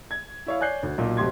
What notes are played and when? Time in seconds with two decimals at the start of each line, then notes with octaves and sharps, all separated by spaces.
0.11 G#6
0.46 E4 C#5 F5
0.60 C#5 D5 G#5 F#6 G6 C7
0.83 D2
0.98 B1 A#2
1.17 F1 B2 G4 C6 G#6